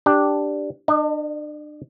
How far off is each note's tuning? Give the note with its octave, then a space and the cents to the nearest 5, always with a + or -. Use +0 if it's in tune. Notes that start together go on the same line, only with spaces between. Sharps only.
D4 +0 G4 +0
D4 +35 D#5 -20